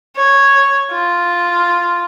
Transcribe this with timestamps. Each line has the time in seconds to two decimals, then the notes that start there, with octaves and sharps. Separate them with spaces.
0.16 C#5
0.91 F4